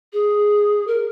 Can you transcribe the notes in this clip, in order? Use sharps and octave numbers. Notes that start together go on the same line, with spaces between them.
G#4
A#4